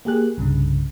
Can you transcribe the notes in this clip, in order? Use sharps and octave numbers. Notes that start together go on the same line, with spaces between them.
A#3 G4 G#4 F#6
C2 G2 C#3